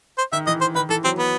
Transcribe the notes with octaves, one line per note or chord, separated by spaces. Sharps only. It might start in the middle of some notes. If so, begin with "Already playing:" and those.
C5
D#3 E5
E3 D#5
C5
D#3 B4
E3 A4
F#3 C4
B3